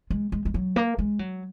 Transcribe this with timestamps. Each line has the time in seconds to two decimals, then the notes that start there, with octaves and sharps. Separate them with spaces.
0.10 G#3
0.32 G#3
0.45 G#3
0.54 F#3
0.76 A#3
0.98 G#3
1.19 F#3